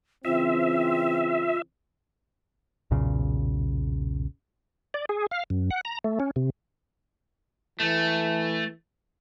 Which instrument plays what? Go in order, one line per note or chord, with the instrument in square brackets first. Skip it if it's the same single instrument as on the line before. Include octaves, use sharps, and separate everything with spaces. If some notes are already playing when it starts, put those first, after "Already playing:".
[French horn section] C#3 E3 C4 [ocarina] F4 [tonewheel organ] E5
[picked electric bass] B1 E2 A#2 C#3
[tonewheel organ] D5
G#4
F5
F#2
F#5
A#5
A3
C#4
C3
[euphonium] E3 [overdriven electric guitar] A3